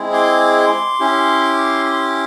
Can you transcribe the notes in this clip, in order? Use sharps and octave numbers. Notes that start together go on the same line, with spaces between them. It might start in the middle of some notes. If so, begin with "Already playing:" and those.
Already playing: G#3 C4 E4 G#4
C6 D6
C#4 E4 G4
C6 D6